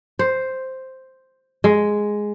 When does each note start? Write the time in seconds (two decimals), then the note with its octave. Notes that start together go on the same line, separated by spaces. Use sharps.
0.19 C5
1.64 G#3